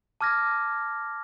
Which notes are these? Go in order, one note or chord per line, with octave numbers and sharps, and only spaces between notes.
A5 D6 F6 G#6 A#6